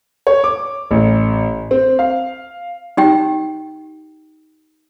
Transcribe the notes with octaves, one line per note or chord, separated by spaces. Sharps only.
C#5
D6
A1
C4
F5
D#4 G4 G5